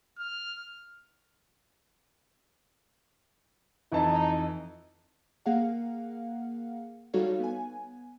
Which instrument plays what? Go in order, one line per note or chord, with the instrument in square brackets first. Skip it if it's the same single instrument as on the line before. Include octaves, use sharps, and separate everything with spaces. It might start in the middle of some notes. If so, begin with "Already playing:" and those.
[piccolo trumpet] F6
[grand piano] F2 E3 A5 [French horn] D#4
[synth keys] A#3 G#4 F5 F#5
G3 D#4 F#4 A4 C#5 F5
B3 G#5